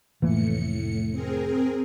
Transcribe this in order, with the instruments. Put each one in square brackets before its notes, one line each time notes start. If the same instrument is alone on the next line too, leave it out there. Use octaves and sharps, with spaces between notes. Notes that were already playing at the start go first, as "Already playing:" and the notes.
[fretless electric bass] F1 E3 A#3 [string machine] A2 C#7
[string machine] C4 G#4 A#4